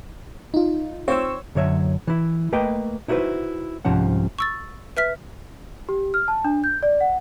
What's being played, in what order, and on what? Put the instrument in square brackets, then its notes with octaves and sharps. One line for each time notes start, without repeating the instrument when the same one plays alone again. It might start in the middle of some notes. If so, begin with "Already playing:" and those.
[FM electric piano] D#4 F4
[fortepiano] C4 [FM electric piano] C#5 C#6 E6
[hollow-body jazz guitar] F#2 D3 F#3 C#5 E5
E3 E4
A3 A#3 B4 D#5 G5
D#4 E4 F#4 A4 B4 C5
C2 G#2 F3 C#4 F#5
[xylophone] C#6 E6 A6
B4 E5 F6 B6
[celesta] G4
F6
A5
D4
G6
D5
F#5